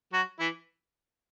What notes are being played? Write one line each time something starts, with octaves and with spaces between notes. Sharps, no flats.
F#3 F#4
E3 E4